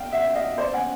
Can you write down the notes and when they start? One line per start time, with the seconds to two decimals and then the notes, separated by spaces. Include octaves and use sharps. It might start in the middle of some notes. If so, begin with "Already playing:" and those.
Already playing: F5 G5
0.12 E5 F#5
0.35 D#5 F5
0.58 C5 D5
0.73 F#5 G#5